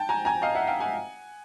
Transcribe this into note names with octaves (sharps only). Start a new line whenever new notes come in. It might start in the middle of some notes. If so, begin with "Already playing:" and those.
Already playing: G5 A5
G#5 A#5
G#5 A#5
D#5 F5
E5 F#5
F5 G5
F#5 G#5